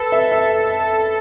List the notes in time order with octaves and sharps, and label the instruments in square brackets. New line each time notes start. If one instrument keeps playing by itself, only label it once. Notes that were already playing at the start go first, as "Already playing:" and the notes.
Already playing: [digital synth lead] A4 [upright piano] B4
[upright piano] E5
E5